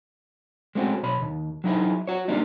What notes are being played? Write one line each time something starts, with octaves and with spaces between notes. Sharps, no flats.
G#3 A3 C4 C#4 F#4
B1 C#5 B5
D#2
F#3 D#4 E4 G#4
F#4 C#5
G3 A#3 D4 D#4